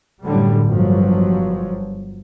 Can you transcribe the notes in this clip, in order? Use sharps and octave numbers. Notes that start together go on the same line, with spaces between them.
F#2 A2 D3 G3
G1 F3 F#3